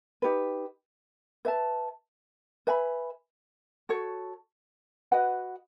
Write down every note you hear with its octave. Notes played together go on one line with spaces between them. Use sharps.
D#4 G4 B4
B4 E5 A5
B4 E5 G#5 B5
F#4 A4 C#5
F#4 B4 D#5 F#5